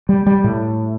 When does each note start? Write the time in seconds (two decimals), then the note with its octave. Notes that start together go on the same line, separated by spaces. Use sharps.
0.09 G3
0.26 G3
0.44 A2